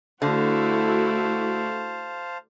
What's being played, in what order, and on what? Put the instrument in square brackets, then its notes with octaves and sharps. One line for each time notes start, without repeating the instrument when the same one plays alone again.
[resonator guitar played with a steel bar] D3 [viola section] A3 E4 F#4 [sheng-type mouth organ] C5 F5 A5